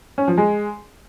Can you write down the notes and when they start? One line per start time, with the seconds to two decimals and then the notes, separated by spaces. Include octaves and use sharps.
0.18 C#4
0.28 F3
0.38 G#3